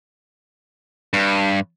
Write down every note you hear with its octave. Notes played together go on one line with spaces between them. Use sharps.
G2